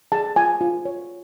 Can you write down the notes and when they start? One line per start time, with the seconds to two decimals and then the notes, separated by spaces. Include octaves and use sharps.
0.12 G#4 A5
0.36 F4 G#5
0.61 F4
0.85 C#5